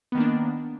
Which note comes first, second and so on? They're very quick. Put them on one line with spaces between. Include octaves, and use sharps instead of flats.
B3 D#3 A#3 D4